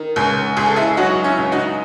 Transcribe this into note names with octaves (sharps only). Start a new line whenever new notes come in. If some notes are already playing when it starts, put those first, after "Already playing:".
Already playing: D#3
C#2
C#2 G#4
A4
E4 G#4
F#3 D#4 F#4
C#4 E4
C#2
D#4 F#4